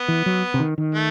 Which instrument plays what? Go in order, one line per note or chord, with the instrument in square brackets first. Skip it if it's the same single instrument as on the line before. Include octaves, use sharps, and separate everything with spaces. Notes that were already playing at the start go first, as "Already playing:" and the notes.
Already playing: [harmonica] B3
[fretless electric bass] E3
F#3
C3
D#3
D#3
[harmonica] A3